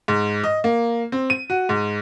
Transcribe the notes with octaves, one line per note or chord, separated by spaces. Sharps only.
G#2
D#5
A#3
C4
D#7
F#4
G#2